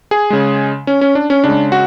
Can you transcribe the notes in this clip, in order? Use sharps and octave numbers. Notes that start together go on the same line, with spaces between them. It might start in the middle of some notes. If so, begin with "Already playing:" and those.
G#4
C#3 G#3
C#4
C#4
D4
C#4
C#3 G#3 D4
F#4